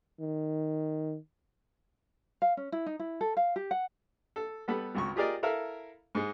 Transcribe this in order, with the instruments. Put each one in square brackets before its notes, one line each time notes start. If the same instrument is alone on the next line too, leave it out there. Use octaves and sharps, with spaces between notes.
[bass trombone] D#3
[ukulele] F5
C#4
E4
D#4
E4
A4
F5
G4
F#5
[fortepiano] A4
G3 B3 A4 B4
G#1 C#2 C#6
F4 G4 G#4 A#4 D5 D#5
E4 A4 A#4 E5 F5
G#2 G#3